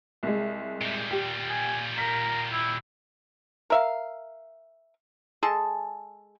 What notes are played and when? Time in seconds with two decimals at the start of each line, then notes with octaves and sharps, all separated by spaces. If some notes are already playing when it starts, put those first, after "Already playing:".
0.23 C2 G#3
0.81 A#2 G3
1.11 G4
1.49 G#5
1.98 A#4 B6
2.52 E4
3.70 A#4 E5 F5
5.43 G#3 G#4 A4 A5